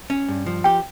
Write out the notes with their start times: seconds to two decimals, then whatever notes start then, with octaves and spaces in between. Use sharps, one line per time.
0.10 C#4
0.28 G2
0.46 F3
0.64 G4 G5